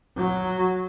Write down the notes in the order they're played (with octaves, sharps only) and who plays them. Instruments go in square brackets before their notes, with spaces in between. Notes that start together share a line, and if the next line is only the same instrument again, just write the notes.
[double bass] F#3